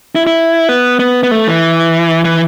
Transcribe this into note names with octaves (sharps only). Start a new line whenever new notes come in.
E4
E4
B3
B3
B3
A3
E3
E3